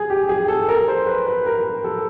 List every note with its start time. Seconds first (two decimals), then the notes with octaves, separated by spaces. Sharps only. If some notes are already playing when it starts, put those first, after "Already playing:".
Already playing: G#4
0.10 G4
0.29 G#4
0.48 A4
0.69 A#4
0.88 C5
1.07 B4
1.26 B4
1.46 A#4
1.84 A4